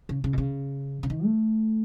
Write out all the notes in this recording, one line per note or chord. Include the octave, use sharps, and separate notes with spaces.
C#3
C#3
B2
C#3
C#3
D#3
A3